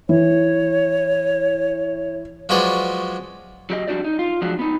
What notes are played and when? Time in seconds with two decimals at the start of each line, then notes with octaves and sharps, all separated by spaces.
0.09 E3 C#5
2.49 F3 F#3 G#3 B4 C#5 D5
3.70 F#3 G4 D#5
3.88 F2 G3 D4 F#4 G4 D5
4.04 D#4
4.19 F4
4.42 F3 F#3 G#3 D4 F#4
4.59 B3 D#4